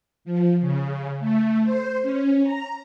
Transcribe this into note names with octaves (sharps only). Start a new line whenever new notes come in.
F3
C#3
A3
C5
C#4
A#5